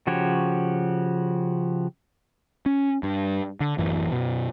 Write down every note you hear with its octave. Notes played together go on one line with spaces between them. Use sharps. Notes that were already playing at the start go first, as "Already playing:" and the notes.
C#3 F3 F#4 G4 C#5
C#4
G2
D3
A1 F#2 E3
F#2 B2